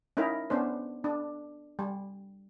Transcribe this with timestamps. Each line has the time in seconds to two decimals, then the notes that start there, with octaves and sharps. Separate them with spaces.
0.17 C#4 D#4 E4 A#4
0.50 B3 C#4 D4 C5
1.04 D4
1.79 G3